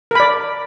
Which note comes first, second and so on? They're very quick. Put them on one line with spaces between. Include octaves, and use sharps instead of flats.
A#4 B5 D5